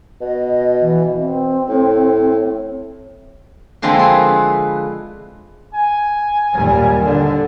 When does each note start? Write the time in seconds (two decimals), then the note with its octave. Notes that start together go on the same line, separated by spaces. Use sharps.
0.21 B2 D#5
0.81 E3
1.16 C4
1.69 A2
3.82 D3 F3 G#3 A#3 C4 E4
3.99 G#4 B4
5.74 G#5
6.55 D#2 A#2 G3
7.04 D3